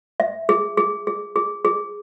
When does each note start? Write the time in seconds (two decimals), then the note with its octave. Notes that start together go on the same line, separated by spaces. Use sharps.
0.20 E5
0.49 G#4
0.77 G#4
1.07 G#4
1.36 G#4
1.65 G#4